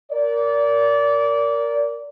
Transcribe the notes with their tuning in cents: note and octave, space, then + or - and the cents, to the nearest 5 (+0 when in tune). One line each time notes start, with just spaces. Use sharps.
A#4 +0 D5 -25